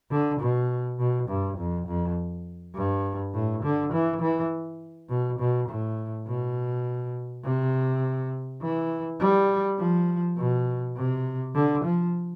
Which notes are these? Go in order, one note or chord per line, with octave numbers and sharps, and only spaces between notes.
D3
B2
B2
G2
F2
F2
G2
A2
D3
E3
E3
B2
B2
A2
B2
C3
E3
G3
F3
B2
C3
D3
F3